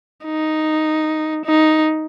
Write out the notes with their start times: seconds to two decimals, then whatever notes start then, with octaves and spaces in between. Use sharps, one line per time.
0.25 D#4
1.45 D#4